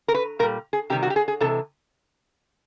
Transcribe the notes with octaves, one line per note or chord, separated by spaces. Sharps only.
A#4
B4
A#2 G3 A#4
G#4
C3 D#3 G3 G4
F#4
G4
G#4
G#4
C3 E3 G#3 A4